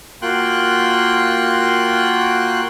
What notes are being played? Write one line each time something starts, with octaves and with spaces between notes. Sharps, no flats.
A#3 F4 F#4 G5 C6 F#6